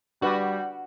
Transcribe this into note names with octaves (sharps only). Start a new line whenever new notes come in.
G3 D4 F#4 B4 D5